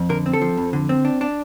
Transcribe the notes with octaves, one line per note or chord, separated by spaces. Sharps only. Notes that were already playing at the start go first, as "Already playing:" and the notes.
Already playing: F2
D3 A#4
C4
A4
F3
F2
D3
C4
D4
D4